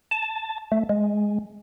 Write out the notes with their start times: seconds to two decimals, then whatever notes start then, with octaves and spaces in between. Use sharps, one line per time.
0.11 A5
0.72 A3
0.89 G#3